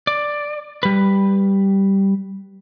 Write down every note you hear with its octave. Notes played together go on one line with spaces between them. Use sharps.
D5
G3 B4